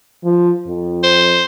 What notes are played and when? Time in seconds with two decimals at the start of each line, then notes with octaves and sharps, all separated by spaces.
0.24 F3
0.67 F2
1.04 C5